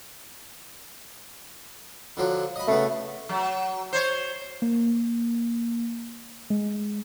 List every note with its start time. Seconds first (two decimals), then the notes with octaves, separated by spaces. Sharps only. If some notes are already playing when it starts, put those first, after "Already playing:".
2.17 D3 F3 F#3
2.56 D#5 B5
2.68 C#3 A3 B3
3.29 F#3
3.93 C5 C#5
4.62 A#3
6.50 G#3